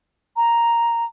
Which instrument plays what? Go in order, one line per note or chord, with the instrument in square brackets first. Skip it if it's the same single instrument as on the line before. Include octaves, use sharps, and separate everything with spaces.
[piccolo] A#5